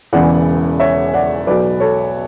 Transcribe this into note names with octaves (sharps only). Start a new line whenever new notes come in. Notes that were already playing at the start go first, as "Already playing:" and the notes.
E1 E2 C#3 E3 D5 F#5
C#5 E5
D5 F#5
B1 B2 F#3 B4 D5
A4 C#5